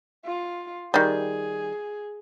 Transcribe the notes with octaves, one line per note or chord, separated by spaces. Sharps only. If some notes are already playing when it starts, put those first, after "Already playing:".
F4
D#3 G3 G#4